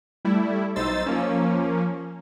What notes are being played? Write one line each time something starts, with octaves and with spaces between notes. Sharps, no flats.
G3 A3 E4
B1 D#4 C5 E6 A6
F3 A#3 C#4